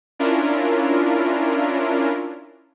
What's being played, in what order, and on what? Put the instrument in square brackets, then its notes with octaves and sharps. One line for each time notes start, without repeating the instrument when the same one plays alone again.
[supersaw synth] C#4 D4 E4 F4 A#4